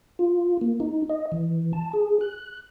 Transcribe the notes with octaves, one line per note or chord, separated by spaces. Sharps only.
F4
A#3
D#4
D#5
E3
A5
G#4
F#6